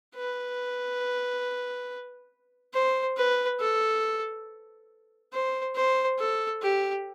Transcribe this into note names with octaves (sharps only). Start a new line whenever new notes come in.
B4
C5
B4
A4
C5
C5
A4
G4